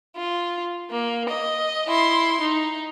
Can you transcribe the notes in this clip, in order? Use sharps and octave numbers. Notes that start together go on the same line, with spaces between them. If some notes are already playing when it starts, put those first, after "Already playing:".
F4
A#3
D#5
E4 C6
D#4